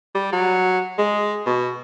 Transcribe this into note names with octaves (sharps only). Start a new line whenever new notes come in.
G3
F#3
G#3
B2